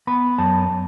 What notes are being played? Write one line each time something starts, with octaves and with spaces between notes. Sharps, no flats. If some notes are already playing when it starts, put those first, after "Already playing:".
B3 B5
F#2 A5